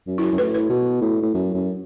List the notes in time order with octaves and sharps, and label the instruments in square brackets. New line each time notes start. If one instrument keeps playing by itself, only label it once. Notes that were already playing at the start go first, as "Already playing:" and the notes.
[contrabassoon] F#2
[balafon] E4
F#4
[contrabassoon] F#2
[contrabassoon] A2 [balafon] B4
[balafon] B4
[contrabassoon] B2
A2
A2
F#2
F#2